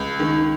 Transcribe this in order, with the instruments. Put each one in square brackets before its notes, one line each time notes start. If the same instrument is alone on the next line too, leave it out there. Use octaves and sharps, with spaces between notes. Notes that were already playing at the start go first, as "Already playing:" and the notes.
Already playing: [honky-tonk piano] C#2
D#3